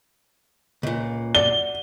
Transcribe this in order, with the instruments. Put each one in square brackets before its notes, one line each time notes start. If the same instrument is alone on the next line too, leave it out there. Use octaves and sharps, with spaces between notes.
[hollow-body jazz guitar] C#2 A#2
[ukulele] F#4 D5 [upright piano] G7